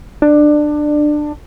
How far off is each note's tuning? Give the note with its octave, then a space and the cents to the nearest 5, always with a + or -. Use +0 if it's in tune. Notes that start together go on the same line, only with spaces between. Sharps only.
D4 +20